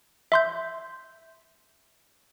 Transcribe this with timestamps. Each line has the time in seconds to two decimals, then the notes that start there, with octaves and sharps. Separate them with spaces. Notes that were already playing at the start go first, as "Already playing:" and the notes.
0.32 E5 C6 G6